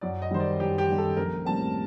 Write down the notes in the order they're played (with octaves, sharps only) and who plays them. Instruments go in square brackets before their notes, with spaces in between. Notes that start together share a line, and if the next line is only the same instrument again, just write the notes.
[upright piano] F#2 [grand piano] D5
[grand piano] D#5
[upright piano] D#3 G3 [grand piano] C5
[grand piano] D5
[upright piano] F#2 [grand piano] G4
[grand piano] G4
[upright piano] D#3 G3
[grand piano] A4
[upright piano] A#1 [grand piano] A#4
[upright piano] A2 G3 C4 [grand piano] A5